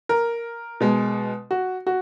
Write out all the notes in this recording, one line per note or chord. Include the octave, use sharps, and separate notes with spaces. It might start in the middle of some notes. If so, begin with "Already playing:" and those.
A#4
B2 G#3
F#4
F#4